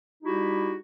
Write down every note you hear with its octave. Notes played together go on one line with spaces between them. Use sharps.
G3 D#4 E4 F#4 G4